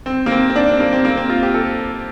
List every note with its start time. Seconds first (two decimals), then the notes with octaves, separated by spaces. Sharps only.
0.06 C4
0.26 A#3
0.31 C4
0.50 C4
0.56 D4
0.68 C4
0.80 A#3
0.92 C4
1.05 A#3
1.17 C4
1.29 F4
1.43 G4
1.54 A4